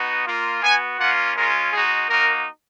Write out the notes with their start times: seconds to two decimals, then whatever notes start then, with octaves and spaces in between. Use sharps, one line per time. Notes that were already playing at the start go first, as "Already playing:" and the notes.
Already playing: B3 D#4 F#4
0.26 A#3 F4
0.63 B3 F#4 G#5
0.99 A#3 C#4 F4 F#5
1.35 G#3 C#4 F4 A#4
1.73 G#3 D#4 F#4 G#4
2.09 A#3 D#4 F#4 A#4